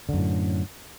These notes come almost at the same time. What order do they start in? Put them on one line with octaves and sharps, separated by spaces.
D3 F#2 A2